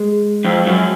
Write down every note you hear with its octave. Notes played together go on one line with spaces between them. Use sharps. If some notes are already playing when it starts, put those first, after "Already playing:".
Already playing: G#3
F2
F#2